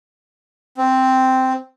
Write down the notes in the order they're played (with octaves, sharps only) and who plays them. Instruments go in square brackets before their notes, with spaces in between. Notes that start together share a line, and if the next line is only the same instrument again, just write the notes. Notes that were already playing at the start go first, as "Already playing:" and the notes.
[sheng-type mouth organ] C4